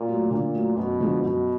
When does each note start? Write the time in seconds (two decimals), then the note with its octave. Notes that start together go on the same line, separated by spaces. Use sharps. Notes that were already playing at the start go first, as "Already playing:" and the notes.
Already playing: A#2
0.08 F#3 A3
0.31 A#2 D3
0.55 F#3 A3
0.76 F#2 B2
1.00 D3 F3 G#3
1.23 F#2 B2